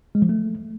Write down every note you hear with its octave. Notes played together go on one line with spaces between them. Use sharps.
G#3
F3
A3